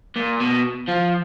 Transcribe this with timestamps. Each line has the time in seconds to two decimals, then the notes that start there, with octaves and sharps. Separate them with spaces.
0.16 A#2
0.40 B2
0.88 F3